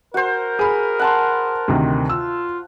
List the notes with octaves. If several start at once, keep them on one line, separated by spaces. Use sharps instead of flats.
F#4 A#4 C5
G#4 B5 F6
F#5 A5 C6
D2 C3 D#3
F4 E6